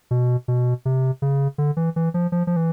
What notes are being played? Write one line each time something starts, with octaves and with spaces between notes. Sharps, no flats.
B2
B2
C3
C#3
D3
E3
E3
F3
F3
F3
E3